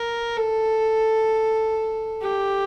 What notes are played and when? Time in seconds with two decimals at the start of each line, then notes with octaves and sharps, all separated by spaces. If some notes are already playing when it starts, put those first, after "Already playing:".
Already playing: A#4
0.37 A4
2.22 G4